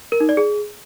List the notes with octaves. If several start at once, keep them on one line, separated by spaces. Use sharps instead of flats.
A#4
D#4
D5
G#4